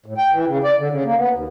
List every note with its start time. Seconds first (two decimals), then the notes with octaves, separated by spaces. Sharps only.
0.06 A2
0.18 G5
0.33 E3
0.47 C#3
0.64 D5
0.79 D3
0.91 C#3
1.04 A#3
1.18 B3
1.33 D#2